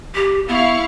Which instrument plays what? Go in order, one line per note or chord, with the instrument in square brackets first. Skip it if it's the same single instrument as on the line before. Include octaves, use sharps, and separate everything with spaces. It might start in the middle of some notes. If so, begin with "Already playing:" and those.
[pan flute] G4
[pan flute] B3 [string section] E4 F5 C#6